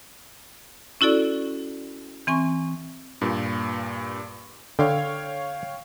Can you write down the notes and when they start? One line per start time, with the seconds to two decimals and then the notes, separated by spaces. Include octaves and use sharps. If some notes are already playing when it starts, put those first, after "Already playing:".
1.01 C#4 E4 F#4 A4 D5
2.27 E3 C4 G#5 C#6
3.21 G2 A#2
4.79 D3 C#5 F5 G5